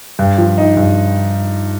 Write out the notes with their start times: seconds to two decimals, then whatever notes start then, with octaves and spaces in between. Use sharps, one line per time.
0.19 G2
0.38 F3
0.58 D#4
0.77 G2